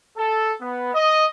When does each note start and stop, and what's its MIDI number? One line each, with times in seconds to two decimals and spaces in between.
0.18 0.53 69
0.61 0.92 59
0.94 1.25 75